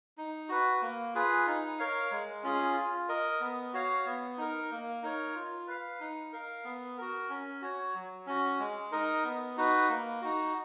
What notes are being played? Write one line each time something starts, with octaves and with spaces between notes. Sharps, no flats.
D#4
F#4 B4
A#3
F4 G#4 B4
D#4
A#4 C#5 F5
G#3
C#4 F4 G#4
F4
A#4 D#5
B3
F#4 C#5 F5
B3
D#4 A#4
A#3
D#4 A#4 C#5
F4
B4 F5
D#4
A#4 F5
B3
F#4 A#4
C#4
F#4 C#5
F#3
C#4 F#4
G#3
D#4 A#4 D#5
B3
D#4 F#4 B4
A#3
D#4 F#4